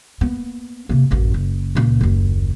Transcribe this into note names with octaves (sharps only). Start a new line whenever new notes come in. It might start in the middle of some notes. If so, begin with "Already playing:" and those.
A#3 B3
C3 A#3
A1 F#2
F#1
C#2 A#2
F#1 D#2